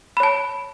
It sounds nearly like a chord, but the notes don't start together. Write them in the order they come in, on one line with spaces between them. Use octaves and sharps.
B5 C#5 A5